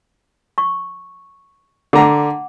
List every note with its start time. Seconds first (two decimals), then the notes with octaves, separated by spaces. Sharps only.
0.58 C#6
1.93 D3 F#5 A#5 D6